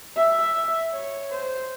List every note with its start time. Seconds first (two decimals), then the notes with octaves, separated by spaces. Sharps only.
0.16 E5
0.93 C#5
1.31 C5